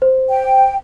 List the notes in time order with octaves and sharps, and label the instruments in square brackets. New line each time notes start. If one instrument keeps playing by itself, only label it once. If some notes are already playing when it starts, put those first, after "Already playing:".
[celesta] C5
[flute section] G5